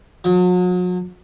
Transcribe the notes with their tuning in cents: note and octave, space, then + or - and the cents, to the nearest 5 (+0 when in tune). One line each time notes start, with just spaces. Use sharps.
F#3 -40